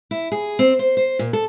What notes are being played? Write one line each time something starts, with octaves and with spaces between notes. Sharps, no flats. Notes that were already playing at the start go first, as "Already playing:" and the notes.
E4
G#4
C4
C5
C5
A#2
A4